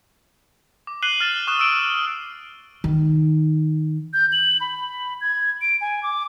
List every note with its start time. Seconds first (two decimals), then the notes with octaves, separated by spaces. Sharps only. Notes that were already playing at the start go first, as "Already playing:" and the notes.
0.87 D6
1.03 F#6 C7 D#7 F#7 G7
1.20 F6 A6 E7
1.47 C#6 D#6 F#6 E7 G7
1.59 E6 F#6 D7 E7
1.79 E6
2.84 D#3
4.13 G6
4.32 F#7
4.61 B5
5.21 G#6
5.61 D7
5.81 G#5
6.03 D6